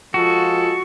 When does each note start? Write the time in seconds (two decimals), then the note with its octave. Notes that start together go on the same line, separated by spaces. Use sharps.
0.14 F3 G#3 F4 F#4 A4